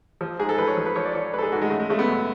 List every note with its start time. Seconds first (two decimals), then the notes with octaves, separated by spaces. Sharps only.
0.21 F3
0.39 G#2 G#4
0.49 A4
0.58 F3 B4
0.68 C#5
0.77 F3
0.86 B4
0.96 F3 C#5
1.05 D5
1.13 F3 C#5
1.33 G#2 B4
1.38 A4
1.42 G#4
1.52 G#2 F#4
1.62 G#3
1.70 C#3 A3
1.80 G#3
1.89 C#3 A3
1.99 B3
2.08 F#2